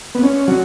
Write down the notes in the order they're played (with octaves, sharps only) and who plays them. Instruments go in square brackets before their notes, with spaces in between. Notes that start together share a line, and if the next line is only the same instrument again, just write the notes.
[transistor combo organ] B3
C#4
F#3